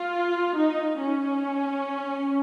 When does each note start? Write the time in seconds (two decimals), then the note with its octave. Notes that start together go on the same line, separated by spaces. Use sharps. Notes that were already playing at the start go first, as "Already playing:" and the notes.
Already playing: F4
0.58 D#4
0.99 C#4